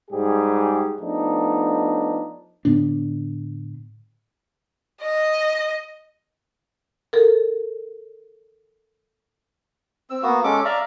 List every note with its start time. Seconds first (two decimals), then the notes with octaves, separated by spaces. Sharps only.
0.11 G#2 G3 G4 G#4
1.00 F3 A3 B3 D4 D#4
2.65 A2 D3 B3 D4
5.02 D#5
7.13 A4 A#4
10.10 C4 E6
10.23 A#3 B3 F#4
10.44 G#3 C#4 A4 D6
10.65 D5 E5 F5 A#5